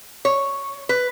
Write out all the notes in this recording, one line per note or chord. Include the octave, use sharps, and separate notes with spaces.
C#5
B4